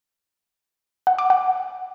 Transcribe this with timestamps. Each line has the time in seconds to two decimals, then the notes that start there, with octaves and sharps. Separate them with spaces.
1.07 F#5
1.18 D6
1.30 F#5